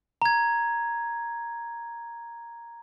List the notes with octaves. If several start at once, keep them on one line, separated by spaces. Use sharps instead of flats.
A#5 G#6